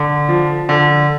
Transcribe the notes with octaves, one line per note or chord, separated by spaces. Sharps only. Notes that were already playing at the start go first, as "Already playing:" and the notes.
Already playing: D3
F3
D3